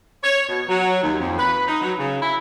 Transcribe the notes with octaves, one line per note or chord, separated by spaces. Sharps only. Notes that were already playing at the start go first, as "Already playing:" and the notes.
C#5
B2
F#3
D#2
F2
B4
D#4
F#3
C#3
E4